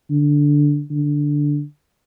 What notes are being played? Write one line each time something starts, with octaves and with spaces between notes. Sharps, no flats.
D3
D3